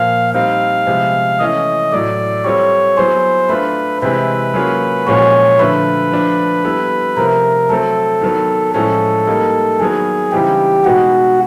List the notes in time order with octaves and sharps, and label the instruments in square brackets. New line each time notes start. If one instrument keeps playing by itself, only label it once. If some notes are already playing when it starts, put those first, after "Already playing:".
Already playing: [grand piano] A#2 F3 A#3 [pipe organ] F5
[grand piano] G3 C4 D#4 [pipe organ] F5
[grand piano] C3 F3 G#3 B3
[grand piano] E3 A3 C#4 [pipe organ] D#5
[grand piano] A2 F#3 A3 [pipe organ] D5
[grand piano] G3 C4 F4 A4 [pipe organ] C#5
[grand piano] F#3 B3 E4 G#4 [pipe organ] C5
[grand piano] A3 D4 F4 [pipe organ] B4
[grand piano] C3 E3 G#3 C4 E4 [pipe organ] B4
[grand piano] F#3 A#3 C#4 F4 G#4
[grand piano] A#2 F3 G#3 C#4 F#4 [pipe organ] C#5
[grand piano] D3 F3 A3 [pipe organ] B4
[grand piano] F3 A3 D4
G3 B3 E4 A4
[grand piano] C3 F3 A3 [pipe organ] A#4
[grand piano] F#3 A3 C4 [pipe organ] A4
[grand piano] D#3 F#3 B3
[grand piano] A2 F3 G#3 C#4 [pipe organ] A4
[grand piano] G3 A#3 D#4
[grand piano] D#3 F#3 B3 [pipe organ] G#4
[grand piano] C#3 E3 G3 C4 D#4 [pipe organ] G4
[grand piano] B2 G#3 B3 D#4 [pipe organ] F#4